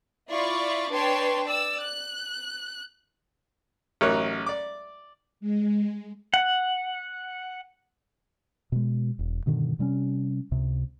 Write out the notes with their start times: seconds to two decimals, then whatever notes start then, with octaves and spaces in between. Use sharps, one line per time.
0.29 E4 F4 D5 B5 C#6
0.91 D4 B4 C#5 G5 A5 C6
1.47 D5 E6
1.85 F#6
4.01 A1 F#3 D#4 A#4 C#5 F#6
4.46 D5 D6
5.40 G#3
6.34 F#5
8.72 B2 G#3
9.19 E1
9.46 G2 B2 D3 D#3
9.79 C3 G3 C4 C#4
10.51 C#2 C3